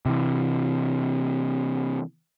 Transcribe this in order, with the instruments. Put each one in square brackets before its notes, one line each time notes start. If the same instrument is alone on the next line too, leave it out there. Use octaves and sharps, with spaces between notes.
[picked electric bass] C3 E3